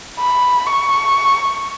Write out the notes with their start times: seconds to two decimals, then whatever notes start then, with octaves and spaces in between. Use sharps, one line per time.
0.19 B5
0.67 C#6